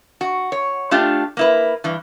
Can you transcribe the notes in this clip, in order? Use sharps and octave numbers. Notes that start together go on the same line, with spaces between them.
F#4
C#5
A3 D4 F4 G4
A#3 E4 B4
G2 E3